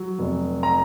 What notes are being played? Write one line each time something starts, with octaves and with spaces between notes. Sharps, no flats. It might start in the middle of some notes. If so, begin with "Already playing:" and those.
Already playing: F#3
F1
A#5